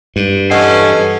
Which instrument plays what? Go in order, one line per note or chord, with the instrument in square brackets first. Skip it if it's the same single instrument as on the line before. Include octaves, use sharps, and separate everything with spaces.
[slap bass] G2
[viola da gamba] E3 A4 [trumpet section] C#4 [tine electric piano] D#5 F#5 C7